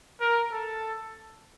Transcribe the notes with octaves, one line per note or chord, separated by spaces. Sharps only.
A#4
A4